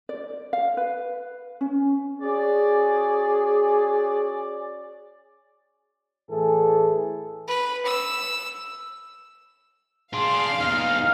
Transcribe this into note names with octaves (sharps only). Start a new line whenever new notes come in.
D5
F5
B4
C#4
C#4 F#4 G#4 D5
A2 E3 G#4 A4
B4
E6
D4 G#4 F5 C6
E2 D#4 F6